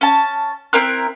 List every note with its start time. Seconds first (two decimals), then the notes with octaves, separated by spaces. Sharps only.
0.01 C#4 A5
0.73 C4 E4 A#4 F#6